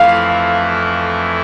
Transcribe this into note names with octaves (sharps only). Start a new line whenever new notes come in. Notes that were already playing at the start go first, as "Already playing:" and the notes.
Already playing: F2 E3 A3 E4 F5